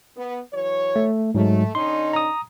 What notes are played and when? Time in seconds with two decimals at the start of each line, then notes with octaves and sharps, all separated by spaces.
0.16 B3
0.52 E3 F#3 C#5
0.96 A3
1.35 G#2 F#3 G#3 A3
1.75 D3 C#4 D#4 C6
2.13 A#5 D#6